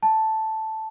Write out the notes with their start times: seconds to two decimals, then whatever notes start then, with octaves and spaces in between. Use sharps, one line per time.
0.03 A5